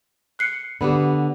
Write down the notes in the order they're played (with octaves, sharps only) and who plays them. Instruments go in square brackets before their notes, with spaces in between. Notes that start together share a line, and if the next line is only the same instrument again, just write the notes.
[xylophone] F#6 C7 C#7
[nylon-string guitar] D3 B3 [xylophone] G4 B5